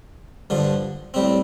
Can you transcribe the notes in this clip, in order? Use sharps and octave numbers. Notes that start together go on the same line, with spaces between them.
G2 D3 F3
A2 G3 C4